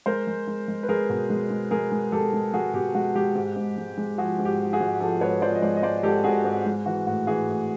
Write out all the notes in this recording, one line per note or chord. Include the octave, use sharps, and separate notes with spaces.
G#3 A#4 C5
G#3
G#3
G#3
B4
G#3 G#4 A#4
B2
G#3
G#3
G#3 G#4 A#4
G#3
G#3 G4 A4
G#3
G#3 F#4 G#4
B2 G4
G#3 F#4
G#3 G4
G#2
G#2
G#3
G#3
F3 F#4 G#4
G#2
G4
F3
F#4 G#4
G#2
F3 G4 A4
G#2 B4 C#5
F3 C5 D5
D#5
G#3 C5 D5
D#5
G#2 C5 D5
G#2 G4 A4
G#2 F#4 G#4
G#2
G#3
E3 F#4
A2 F#4
E3 F#4 G#4
A2